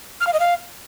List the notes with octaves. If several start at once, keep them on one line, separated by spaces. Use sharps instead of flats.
F6
F5
D#5
F5